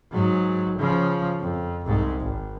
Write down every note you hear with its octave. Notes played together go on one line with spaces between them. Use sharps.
G#2 F#3
C#3 F3
F2
C2 G#2
G#1